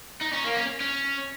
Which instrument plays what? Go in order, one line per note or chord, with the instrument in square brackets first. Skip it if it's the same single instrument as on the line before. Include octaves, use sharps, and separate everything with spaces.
[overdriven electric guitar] D#4
C#4
A#3
C#4
C#4